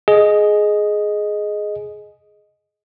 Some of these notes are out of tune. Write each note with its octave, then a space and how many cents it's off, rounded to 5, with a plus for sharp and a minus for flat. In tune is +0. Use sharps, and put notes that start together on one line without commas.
G#4 +15 D#5 +0